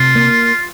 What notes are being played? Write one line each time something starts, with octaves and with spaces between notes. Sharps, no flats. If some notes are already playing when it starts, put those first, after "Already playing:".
Already playing: C3 F4
A#3